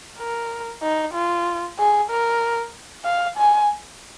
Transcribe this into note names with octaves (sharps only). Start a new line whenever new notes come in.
A#4
D#4
F4
G#4
A#4
F5
G#5